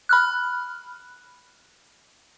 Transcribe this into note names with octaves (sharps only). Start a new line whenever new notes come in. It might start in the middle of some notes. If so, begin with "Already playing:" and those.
B5 F6 F#6